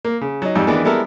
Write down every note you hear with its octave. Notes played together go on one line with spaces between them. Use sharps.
A#3
C#3
F#3 D#4
F2 G#2 G3
D#3 E3 G#3 B3 D4 D#4
G3 G#3 B3 E4 A4 A#4